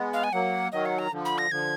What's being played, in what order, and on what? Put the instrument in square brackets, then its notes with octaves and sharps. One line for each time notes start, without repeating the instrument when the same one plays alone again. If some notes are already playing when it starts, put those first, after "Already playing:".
Already playing: [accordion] G#3 B3
[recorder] F5
G#5
[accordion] F#3 A#3 [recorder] F#5
[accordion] D#3 F#3 [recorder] D#5
[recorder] F#5
A#5
[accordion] D3 F3
[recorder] B5
A#6
[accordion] D3 F3 [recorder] G#6